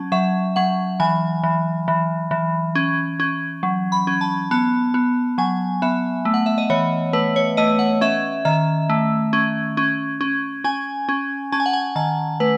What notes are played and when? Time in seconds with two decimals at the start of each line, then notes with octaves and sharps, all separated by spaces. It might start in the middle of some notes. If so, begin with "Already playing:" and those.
Already playing: F#3 C#4 A5
0.12 F#3 E5
0.56 F#3 F#5
1.00 E3 G#5
1.44 E3
1.88 E3
2.31 E3
2.75 C#4
3.20 C#4
3.63 F#3
3.92 B5
4.07 C#4
4.21 A5
4.51 B3 A5
4.94 B3
5.38 F#3 G#5
5.82 B3 E5
6.25 A3
6.34 F#5
6.46 E5
6.58 D#5
6.70 E3 C#5
7.13 A3 B4
7.36 C#5
7.57 A3 D#5
7.79 F#5
8.01 C#4 E5
8.45 D#3 E5
8.89 A3
9.33 C#4
9.77 C#4
10.21 C#4
10.64 C#4 G#5
11.09 C#4
11.52 C#4 A5
11.60 G#5
11.66 F#5
11.73 G#5
11.96 D#3 A5
12.40 A3 B4